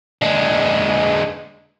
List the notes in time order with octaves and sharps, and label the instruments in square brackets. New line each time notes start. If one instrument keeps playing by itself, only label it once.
[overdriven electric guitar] D3 G#3